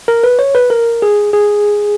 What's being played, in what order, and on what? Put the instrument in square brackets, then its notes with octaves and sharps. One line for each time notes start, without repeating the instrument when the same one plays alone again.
[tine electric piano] A#4
B4
C#5
B4
A#4
G#4
G#4